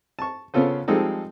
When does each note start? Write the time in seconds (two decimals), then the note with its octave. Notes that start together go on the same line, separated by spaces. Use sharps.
0.19 A5 C#6
0.54 C#3 B3 C#4 F4 A4 C5
0.88 F3 G3 G#3 C4 D#4 A4